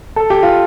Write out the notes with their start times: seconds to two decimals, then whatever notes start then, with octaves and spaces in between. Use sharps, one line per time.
0.16 A4
0.30 G4
0.43 F4